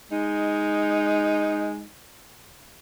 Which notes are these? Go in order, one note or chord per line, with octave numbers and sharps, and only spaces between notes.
G#3 D#4